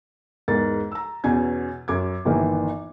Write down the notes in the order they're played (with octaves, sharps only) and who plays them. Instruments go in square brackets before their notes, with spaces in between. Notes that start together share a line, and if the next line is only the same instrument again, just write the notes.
[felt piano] E2 G#2 A#4 A6
A#5 E6
E2 B2 C#4 G#5 G#6
F#2 D6 G#6
G1 A#2 D#3 E3